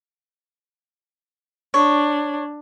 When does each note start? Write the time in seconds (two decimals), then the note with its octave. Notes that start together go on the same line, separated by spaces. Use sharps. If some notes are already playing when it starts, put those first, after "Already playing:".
1.74 D4 C#5